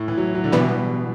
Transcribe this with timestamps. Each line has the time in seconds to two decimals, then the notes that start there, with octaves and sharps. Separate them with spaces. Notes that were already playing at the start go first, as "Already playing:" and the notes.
Already playing: A2
0.08 E3
0.18 F#3
0.35 F#3
0.44 D3
0.52 B2 E3 G3 B3